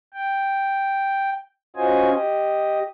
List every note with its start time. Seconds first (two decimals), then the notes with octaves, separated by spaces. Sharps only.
0.14 G5
1.76 C#4 F4 F#4 C5 D#5 G#5
2.12 G4 D#5